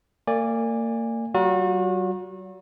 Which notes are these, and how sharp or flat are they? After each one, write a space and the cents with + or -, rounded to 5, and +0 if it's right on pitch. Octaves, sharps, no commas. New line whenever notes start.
A#3 -35 D5 +0 G#5 -25
F#3 +45 F#4 -40